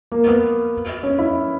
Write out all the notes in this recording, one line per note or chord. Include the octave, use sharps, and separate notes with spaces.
A#3
B3
C#4
E4